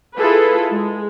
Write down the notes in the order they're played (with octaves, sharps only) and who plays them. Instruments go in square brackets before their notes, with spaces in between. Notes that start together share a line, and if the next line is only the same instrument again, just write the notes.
[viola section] E4 F4 G#4 A4 B4
G#3